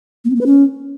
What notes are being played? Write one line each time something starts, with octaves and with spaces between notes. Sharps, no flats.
A#3
C4
A#3
B4
C#4